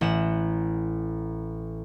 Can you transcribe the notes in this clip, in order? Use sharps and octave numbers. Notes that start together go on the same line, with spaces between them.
A1 F#5 E7